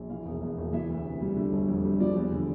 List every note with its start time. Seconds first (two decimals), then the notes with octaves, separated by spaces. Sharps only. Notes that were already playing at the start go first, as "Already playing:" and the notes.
Already playing: A#1
0.10 E3 F5
0.26 E1
0.41 E2
0.58 E1
0.73 E3 E5
0.89 D2
1.05 C3
1.21 G3
1.36 D3
1.52 G1
1.68 F2
1.84 G3
2.00 F3 D5
2.16 E2
2.32 D3